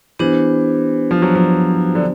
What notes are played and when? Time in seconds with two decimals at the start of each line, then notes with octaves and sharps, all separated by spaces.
0.19 E3 B3 D4 G4 C5
1.11 F3
1.22 F#3
1.36 F3
1.95 D3